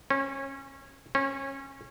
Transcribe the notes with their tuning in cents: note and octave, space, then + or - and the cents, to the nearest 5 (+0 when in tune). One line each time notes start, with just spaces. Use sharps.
C#4 -25
C#4 -25